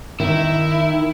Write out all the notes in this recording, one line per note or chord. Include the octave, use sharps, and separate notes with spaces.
D#3 E4